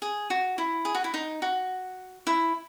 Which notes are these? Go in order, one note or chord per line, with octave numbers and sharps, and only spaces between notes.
G#4
F#4
E4
G#4
F#4
E4
D#4
F#4
E4